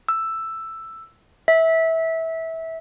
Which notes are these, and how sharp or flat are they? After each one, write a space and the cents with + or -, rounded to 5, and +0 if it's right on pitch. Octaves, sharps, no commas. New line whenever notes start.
E6 +5
E5 -20